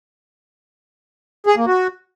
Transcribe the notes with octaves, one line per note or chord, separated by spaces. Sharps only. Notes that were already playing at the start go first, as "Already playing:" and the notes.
G#4
A#3
F#4